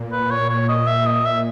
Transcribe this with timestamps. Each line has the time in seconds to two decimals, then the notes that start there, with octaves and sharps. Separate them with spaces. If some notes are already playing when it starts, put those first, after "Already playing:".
Already playing: A#2
0.12 B4
0.31 C#5
0.49 C#5
0.68 D#5
0.87 E5
1.06 D#5
1.25 E5